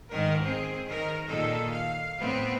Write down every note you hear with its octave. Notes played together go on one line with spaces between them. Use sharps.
G#2 D#3 A#4
C4 G#4
D#3 A#4
A#2 D#3 G#4 A4
F5
A2 B3 C4